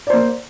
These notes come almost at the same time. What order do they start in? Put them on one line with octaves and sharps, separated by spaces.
D5 C5 A#3